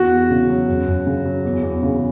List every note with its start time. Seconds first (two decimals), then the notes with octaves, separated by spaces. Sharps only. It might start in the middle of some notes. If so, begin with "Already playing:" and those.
Already playing: E2 F#4
0.11 E2
0.30 C#3
0.49 F#3
0.67 F#2
0.87 F#2
1.06 C#3
1.25 F#3
1.45 E2
1.63 E2
1.82 C#3